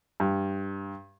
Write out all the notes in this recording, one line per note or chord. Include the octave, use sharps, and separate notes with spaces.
G2